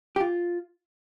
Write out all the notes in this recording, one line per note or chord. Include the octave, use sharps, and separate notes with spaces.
G4
F4